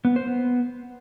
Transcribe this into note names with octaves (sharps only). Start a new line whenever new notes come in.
B3
C5
B3